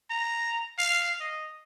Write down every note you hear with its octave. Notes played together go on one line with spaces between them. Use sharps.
A#5
F5
D#5